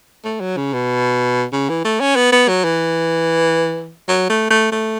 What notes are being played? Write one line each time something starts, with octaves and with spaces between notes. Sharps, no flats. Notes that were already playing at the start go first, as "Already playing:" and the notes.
A3
F#3
C#3
B2
C#3
E3
A3
C#4
B3
B3
F#3
E3
F#3
A3
A3
A3